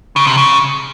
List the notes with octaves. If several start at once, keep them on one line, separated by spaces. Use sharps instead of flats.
C#3
C3
C#3